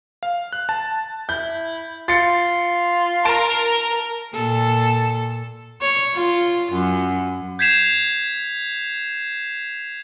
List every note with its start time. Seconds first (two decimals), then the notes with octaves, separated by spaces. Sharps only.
0.23 F5
0.53 F#6
0.69 A5
1.29 E4 G6
2.08 F4 A6 C#7
3.25 A#4 A5 D7
4.33 A#2 A4
5.81 C#5
6.15 F4
6.73 F#2
7.59 G6 G#6 B6 C7 E7 F7